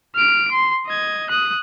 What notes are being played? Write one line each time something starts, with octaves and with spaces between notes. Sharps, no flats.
F6 D7
C6
D#5 G#6
D#6 F#6